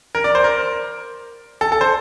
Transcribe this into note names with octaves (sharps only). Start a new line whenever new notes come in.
A#4
D5
C5
A#4
A4
A4
C5